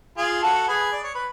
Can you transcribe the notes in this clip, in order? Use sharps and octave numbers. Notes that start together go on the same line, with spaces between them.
F4 G#4
F#4 A4
G#4 B4
D5
C#5
B4